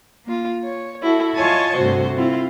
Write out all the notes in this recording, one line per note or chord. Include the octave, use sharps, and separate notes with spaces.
A#3 F4
C#5
E4 F#4 A4
F4 C#5 D#5 G#5 A5 C#6
D2 G2 C3 F#4 C5
C4 E4 F4 F5